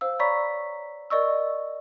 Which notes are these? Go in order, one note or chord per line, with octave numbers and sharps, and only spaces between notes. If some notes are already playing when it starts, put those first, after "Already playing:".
C5 F5 E6
C#5 D5 A#5 B5 C#6 B6
A#4 D5 D#5 C#6 E6